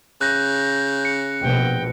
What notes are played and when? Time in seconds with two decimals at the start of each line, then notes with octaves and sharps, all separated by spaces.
0.21 C#3 F#6 G6 A#6
1.05 C#7
1.42 A#1 B2 G5